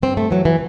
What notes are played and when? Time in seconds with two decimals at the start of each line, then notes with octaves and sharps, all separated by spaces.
0.02 G2 C4
0.17 A3
0.31 E3 F#3
0.45 E3